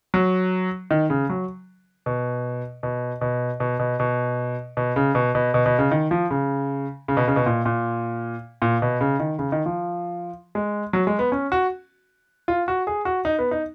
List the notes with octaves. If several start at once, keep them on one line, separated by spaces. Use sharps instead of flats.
F#3
D#3
C#3
F#3
B2
B2
B2
B2
B2
B2
B2
C#3
B2
B2
B2
B2
C#3
D#3
F3
C#3
C#3
B2
C#3
B2
A#2
A#2
A#2
B2
C#3
D#3
C#3
D#3
F3
G#3
F#3
G#3
B3
C#4
F#4
F4
F#4
G#4
F#4
D#4
B3
D#4